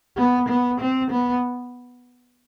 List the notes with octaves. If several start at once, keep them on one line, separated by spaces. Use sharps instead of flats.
B3
B3
C4
B3